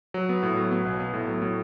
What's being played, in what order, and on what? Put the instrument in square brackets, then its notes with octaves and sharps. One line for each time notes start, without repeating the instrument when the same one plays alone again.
[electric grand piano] F#3
B3
A2
F#3
B3
B1
B3
A2
F#3
A2